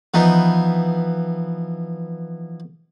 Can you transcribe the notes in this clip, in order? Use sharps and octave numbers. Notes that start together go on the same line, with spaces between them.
E3 F3 B3 D#4